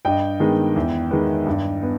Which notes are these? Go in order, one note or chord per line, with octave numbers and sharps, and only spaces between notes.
G2 D#5 G5
D#3 G#3 B3
E2
D#3 G#3 B3
G2
B3